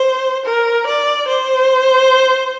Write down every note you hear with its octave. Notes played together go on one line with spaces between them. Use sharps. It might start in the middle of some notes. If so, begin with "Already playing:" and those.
Already playing: C5
A#4
D5
C5